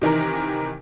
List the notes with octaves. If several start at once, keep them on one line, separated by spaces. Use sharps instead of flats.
C3 D#3 E3 A#4